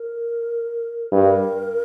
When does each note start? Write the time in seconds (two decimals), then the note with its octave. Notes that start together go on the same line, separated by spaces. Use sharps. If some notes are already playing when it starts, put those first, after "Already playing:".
Already playing: A#4
1.11 G2 A#4